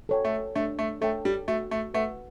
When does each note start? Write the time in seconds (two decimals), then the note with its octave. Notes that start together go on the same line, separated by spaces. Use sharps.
0.09 A4 C#5 G5
0.25 A3
0.55 A3 D4
0.79 A3
1.01 A3 A4 C#5 G5
1.25 G3
1.48 A3 F#4
1.71 A3
1.94 A3 B4 F#5